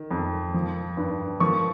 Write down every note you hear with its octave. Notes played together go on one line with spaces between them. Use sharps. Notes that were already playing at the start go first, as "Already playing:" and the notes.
Already playing: D#3
F2
F3
G2
F3 C#6